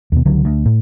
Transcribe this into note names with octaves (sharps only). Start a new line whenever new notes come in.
D#2 B2
C#2 D3 F#3
D2
A2